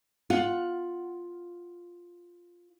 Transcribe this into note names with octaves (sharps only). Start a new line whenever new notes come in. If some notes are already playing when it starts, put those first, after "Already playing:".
F4 F#5